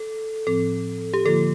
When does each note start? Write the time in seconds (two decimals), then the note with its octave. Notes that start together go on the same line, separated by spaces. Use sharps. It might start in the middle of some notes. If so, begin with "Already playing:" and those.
Already playing: A4
0.47 A2 F3 C4 A4
1.14 G4
1.25 D3 F3 A#3 F4 A4